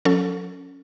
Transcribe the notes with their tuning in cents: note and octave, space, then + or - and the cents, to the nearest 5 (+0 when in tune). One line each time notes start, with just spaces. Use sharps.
F#3 -45 C#4 +0 A4 +15